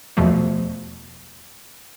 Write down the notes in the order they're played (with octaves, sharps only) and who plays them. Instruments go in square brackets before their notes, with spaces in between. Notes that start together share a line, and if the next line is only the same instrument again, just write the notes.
[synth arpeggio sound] E2 B2 F3 A3